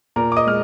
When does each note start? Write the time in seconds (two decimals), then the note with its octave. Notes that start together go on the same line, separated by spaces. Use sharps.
0.16 A#2 A#4 A#5
0.32 D6
0.36 D#5 D#6
0.47 G#3 F6